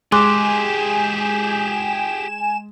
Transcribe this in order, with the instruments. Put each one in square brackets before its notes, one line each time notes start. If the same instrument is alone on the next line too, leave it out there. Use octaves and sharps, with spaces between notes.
[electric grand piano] G#3 [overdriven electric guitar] G4 G#4 [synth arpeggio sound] G#5 E7 [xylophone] C6 D6 F#6